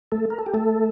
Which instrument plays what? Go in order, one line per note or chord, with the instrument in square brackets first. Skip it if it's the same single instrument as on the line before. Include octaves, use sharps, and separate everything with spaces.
[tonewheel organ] A3 A4
A#4
A4
G4
A3 A4